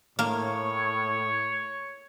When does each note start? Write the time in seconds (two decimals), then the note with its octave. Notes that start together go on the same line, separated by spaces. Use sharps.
0.19 A2 A#3 C#5